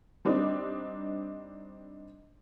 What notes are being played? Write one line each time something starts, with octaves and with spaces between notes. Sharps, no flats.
G3 C4 D4 D#4